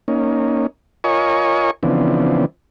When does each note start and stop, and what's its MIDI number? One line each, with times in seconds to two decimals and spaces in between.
0.08 0.67 58
0.08 0.67 61
0.08 0.67 63
1.04 1.71 65
1.04 1.71 70
1.04 1.71 73
1.04 1.71 75
1.04 1.71 80
1.04 1.71 85
1.83 2.46 49
1.83 2.46 52
1.83 2.46 53
1.83 2.46 59
1.83 2.46 60
1.83 2.46 62